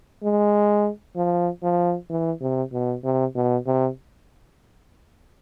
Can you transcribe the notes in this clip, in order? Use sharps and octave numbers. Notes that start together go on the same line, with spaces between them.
G#3
F3
F3
E3
C3
B2
C3
B2
C3